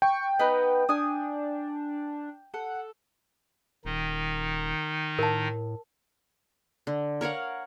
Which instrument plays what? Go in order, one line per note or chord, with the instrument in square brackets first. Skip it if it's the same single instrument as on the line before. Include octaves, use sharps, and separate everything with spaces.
[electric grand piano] G5 [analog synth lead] C#6
[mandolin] B3 D#4 B4 [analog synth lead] D#5
[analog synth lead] D4 [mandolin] G#5 D#6
[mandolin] A4 [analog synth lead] F#5
[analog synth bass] D#1 [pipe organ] D#3 D#4
[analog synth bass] A2 [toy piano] A#4 A5
[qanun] D3
A#4 C#5 F5 F#5